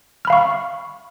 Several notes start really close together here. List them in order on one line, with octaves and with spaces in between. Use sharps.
F6 B5 F5 C#6